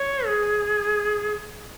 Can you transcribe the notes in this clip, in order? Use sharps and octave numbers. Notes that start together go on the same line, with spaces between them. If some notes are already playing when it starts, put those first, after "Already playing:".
Already playing: C#5
G#4